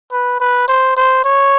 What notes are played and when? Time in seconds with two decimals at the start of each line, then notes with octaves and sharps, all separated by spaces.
0.11 B4
0.40 B4
0.68 C5
0.96 C5
1.24 C#5